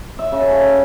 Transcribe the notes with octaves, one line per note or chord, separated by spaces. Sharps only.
E5
C#3
A4